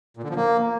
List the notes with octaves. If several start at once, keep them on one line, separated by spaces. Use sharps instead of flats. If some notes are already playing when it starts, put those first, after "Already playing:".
A#2
D3
F3
A#3